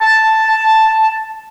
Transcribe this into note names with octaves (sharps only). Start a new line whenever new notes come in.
A5